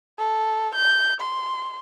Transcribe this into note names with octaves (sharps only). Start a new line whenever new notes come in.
A4
G6
C6